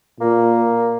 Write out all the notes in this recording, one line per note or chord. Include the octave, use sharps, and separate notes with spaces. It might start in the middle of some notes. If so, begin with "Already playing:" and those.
A#2 A#3